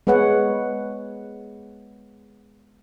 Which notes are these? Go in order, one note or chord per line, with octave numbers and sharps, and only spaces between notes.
G#3 B3 G#4 B4 C#5 F#5